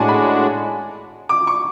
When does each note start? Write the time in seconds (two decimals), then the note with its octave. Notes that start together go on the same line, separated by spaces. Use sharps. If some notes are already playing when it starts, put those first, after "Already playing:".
Already playing: A2 G#3 D4 F#4 G#5 A5
0.09 B5
1.29 D6
1.47 C#6